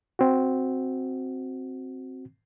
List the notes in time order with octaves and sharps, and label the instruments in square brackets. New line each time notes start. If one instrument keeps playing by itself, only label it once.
[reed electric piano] C4 F#4